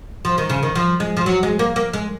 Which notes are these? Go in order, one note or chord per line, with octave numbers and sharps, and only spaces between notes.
F3
D#3
C#3
D#3
F3
G#3
F3
F#3
G#3
A#3
A#3
G#3